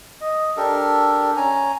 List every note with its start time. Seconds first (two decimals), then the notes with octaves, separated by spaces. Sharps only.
0.21 D#5
0.57 D4 G4 A4 A#4
1.36 C#4 G#5 A#5